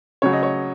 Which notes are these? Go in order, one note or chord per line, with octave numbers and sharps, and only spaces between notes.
C#3 F#3 C#5
D#5
C#5